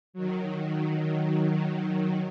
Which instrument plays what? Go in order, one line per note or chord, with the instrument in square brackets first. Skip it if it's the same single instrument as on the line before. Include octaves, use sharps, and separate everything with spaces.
[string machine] D#3 F#3